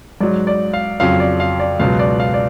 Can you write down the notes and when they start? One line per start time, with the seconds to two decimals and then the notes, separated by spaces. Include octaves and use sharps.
0.21 G#2 F#3 D5
0.47 D5
0.73 F5
1.00 F2 C#3 F#3 F5
1.20 D5
1.40 F5
1.59 D5
1.79 C#2 B2 F#3 F5
1.99 D5
2.20 F5
2.34 D5